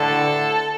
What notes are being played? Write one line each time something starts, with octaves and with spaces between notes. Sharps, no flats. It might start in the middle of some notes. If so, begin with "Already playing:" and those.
Already playing: A2 D3 A4